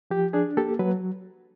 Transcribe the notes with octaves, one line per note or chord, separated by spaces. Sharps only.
F3 G4
D4 G#4
A#3 G4 A4
F#3 B4